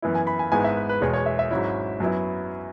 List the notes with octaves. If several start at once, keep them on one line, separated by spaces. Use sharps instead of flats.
F#2 E3 B3 E4
G#5
B5
G#5
G#1 G#2 G#3 B3 E4 G#5
E5
B4
B4
E1 E2 B2 G#3 C#5
C#5
E5
E5
G#1 G#2 F#3 C#4 E4
F#2 F#3 B3 E4